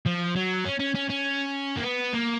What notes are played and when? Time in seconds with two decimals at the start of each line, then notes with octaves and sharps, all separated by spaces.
0.06 F3
0.36 F#3
0.65 C#4
0.80 C#4
0.95 C#4
1.10 C#4
1.77 A#3
1.83 B3
2.14 A#3